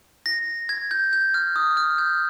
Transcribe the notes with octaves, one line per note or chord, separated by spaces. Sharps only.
A#6
G#6
G6
G6
F6
D#6
F6
G6